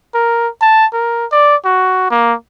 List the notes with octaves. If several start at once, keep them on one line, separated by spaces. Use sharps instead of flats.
A#4
A5
A#4
D5
F#4
A#3